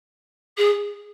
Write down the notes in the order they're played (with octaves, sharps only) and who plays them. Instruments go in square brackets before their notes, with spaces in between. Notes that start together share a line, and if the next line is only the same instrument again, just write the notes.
[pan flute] G#4